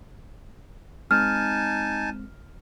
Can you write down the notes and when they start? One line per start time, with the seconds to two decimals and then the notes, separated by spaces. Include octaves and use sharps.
1.11 G#3 C4 D#4 G#5 A5 F6